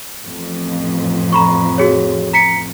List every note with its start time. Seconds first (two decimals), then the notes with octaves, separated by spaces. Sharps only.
0.23 A1 F2
1.33 A#5 B5 C#6
1.78 F#4 G#4 C#5
2.33 A#5 B6 C#7